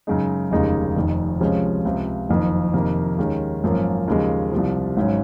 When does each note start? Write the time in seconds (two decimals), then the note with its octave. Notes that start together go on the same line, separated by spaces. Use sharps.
0.07 F#2 C#3 G#3 D#4
0.51 F1 D#2 C#3 G#3 D#4
0.96 F1 F2 D#3
1.40 C#2 C3 F3 G#3 C#4
1.85 C#2 C3 F3
2.29 F#1 F2 D#3
2.74 F2 C3 D#3 A#3
3.18 D#2 D#3 G#3 C#4
3.63 G#1 F#2 F3 A#3 C#4
4.08 D#2 C#3 F3 G#3
4.52 C2 C3 F3
4.97 G#1 G#2 F#3 C#4